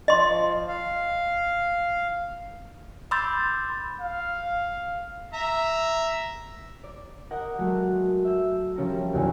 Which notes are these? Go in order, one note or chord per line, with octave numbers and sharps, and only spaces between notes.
F3 D#5 C6
F5
B5 C6 D6 E6 G6 A6
F5
E5 A#5
D5
A#4 D#5 F#5 G6 A#6
F#3 G#3 A3
E5 G6
F3 G3 C#4 A#4 A#5
D#1 B1 E2 F#3 A3 G#4